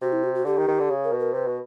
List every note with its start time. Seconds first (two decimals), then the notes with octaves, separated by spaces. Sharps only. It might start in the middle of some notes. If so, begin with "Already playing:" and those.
0.01 C3 F#4
0.13 E4
0.23 F#4
0.35 F#4
0.46 D3 G4
0.57 D#3
0.68 D#3
0.79 D3
0.90 C#3
1.04 A#4
1.12 B2
1.19 A#4
1.34 C3 B4
1.47 B2